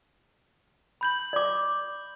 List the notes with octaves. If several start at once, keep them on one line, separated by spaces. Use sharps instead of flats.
B5 G6 F#7
D5 D6